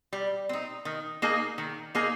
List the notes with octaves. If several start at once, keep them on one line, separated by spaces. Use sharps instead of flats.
G3
C4 D#4
D#3
A#3 D#4 G#4
D#3
A#3 D#4 G#4